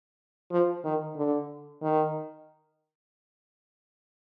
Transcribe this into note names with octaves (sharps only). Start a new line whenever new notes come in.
F3
D#3
D3
D#3